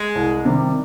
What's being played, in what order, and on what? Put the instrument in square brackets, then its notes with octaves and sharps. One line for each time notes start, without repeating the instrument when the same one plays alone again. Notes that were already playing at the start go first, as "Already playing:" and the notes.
Already playing: [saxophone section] G#3
[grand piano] C2
C3 D#3 G3